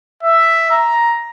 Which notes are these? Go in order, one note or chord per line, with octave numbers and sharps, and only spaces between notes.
E5
A#5